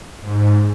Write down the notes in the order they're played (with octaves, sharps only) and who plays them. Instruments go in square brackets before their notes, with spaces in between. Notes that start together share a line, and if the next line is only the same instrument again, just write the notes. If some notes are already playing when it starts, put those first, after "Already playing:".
[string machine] G#2